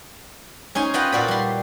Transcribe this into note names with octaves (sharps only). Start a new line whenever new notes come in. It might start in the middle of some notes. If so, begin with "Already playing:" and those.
C#4 D#4 G#5 C6
F4 B4 D#5 F#5 G5
A#2 F#4 D5 B5
G3 C6